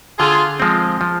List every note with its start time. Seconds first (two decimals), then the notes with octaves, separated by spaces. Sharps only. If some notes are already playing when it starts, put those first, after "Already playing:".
0.19 D3 F4 G#4
0.60 F3 G#3 C4
1.01 F3